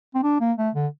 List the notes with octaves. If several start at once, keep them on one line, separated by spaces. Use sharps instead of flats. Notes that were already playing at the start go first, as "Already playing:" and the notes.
C4
D4
A#3
A3
D3